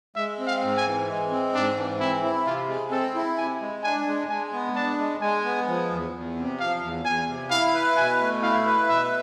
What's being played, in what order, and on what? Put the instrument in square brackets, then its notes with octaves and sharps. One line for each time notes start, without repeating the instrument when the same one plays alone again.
[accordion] G#3 [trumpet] E5
[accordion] C4
[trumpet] F5
[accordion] G#2
[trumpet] G#5
[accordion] E3
G#3
C4
[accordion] G#2 [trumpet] D4
[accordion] E3
[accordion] C4 [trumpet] E4
[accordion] E4
[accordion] C3 [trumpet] F4
[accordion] G#3
[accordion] C4 [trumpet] A4
[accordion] E4
[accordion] C3 [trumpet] G#5
[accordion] G#3
[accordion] D4 [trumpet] G#5
[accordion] G#3
[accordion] G#3 [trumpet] G#5
[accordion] B3
[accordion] D4 [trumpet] A5
[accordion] G#3
[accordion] G#3 [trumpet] G#5
[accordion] B3
F3
E2
E2
C3
[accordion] F3 [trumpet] F5
[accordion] E2
[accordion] E2 [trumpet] G#5
[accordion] C3
[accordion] E4 [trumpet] F5
[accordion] B4
[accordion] B2 [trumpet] G#5
[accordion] A3
[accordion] E4 [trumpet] F5
[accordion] B4
[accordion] B2 [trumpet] E5